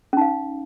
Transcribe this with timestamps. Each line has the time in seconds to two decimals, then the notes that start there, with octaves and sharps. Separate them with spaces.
0.13 C#4
0.17 D#4
0.21 F5